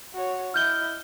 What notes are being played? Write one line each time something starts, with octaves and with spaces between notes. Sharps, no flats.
F#4 C#5
E4 D#5 F6 G6 G7